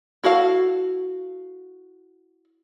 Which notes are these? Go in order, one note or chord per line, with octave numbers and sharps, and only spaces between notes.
E4 F#4 A4 F5